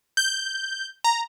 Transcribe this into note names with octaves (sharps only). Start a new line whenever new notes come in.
G6
A#5